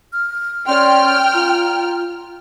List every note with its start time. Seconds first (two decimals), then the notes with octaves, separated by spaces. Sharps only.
0.12 F6
0.67 C#4 D5 G5 C6 F6
1.33 F4 A#5